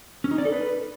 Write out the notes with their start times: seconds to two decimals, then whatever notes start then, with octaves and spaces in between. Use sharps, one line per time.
0.24 C#4
0.31 D#4
0.38 D5
0.45 A4
0.52 B4